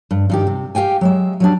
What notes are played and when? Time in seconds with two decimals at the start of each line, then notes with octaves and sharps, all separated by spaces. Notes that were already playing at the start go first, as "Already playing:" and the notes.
0.11 G2
0.30 G2 D#3 G4
0.47 C3
0.75 G4 F5 G5 G#5
1.01 F#3 G#3 E5
1.40 F#3 G3 D4